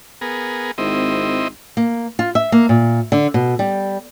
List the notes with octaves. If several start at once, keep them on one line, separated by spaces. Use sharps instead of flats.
B3 G#4 A#4
G#1 C4 E4 D#5
A#3
F4
E5
A#3
A#2
D3
B2
G3